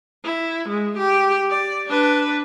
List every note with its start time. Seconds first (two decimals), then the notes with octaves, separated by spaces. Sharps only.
0.24 E4
0.68 G#3
0.97 G4
1.50 D5
1.86 D4 B4